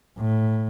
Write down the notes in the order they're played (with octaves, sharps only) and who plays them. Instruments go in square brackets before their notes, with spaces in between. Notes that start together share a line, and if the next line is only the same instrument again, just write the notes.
[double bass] A2